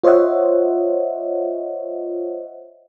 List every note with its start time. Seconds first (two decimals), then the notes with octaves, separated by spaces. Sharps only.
0.04 F4 C5 C#5 D#5 E5 F#5